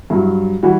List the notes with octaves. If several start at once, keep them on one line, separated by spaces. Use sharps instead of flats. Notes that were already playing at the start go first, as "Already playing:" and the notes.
G2 F#3 E4
E3 G3 F#4